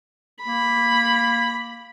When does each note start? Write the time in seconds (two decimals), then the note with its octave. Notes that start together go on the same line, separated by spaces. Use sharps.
0.44 A#3 B5